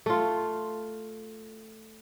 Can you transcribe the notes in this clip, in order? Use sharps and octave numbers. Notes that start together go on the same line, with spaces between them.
A3 F4